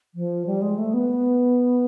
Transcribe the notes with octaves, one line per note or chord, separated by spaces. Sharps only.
F3
G3
G#3
A3
B3